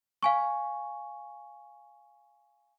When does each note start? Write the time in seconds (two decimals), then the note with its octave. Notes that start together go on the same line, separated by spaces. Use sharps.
0.23 F5 G#5 C#6